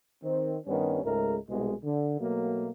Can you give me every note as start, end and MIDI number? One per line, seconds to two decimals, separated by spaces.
0.23 0.58 51
0.23 0.58 60
0.66 1.02 43
0.66 1.02 51
0.66 1.02 55
0.66 1.02 59
0.66 1.02 61
1.04 1.37 37
1.04 1.37 44
1.04 1.37 56
1.04 1.37 57
1.04 1.37 70
1.49 1.74 36
1.49 1.74 47
1.49 1.74 56
1.84 2.18 50
2.20 2.69 47
2.20 2.69 54
2.20 2.69 57
2.20 2.69 58